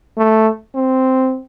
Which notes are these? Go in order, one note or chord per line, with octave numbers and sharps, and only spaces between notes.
A3
C4